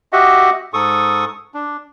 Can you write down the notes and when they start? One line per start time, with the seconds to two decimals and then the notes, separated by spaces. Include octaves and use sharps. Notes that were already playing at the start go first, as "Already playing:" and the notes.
0.13 F#4 G4 D#5 E5 F#5
0.74 G#2 A4 C#6 D#6
1.54 D4